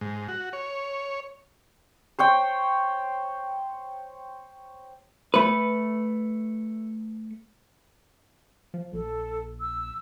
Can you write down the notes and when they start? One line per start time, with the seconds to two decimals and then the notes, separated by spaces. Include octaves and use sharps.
0.01 G#2
0.28 F#4
0.53 C#5
2.19 C5 C#5 G5
5.34 A3 B4
8.74 F3
8.93 A#1 A4
9.61 E6